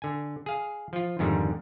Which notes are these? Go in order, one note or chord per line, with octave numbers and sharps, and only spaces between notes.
D3 G#5
G#4 F5
F3 F4
F2 G#2 D3 D#3 G3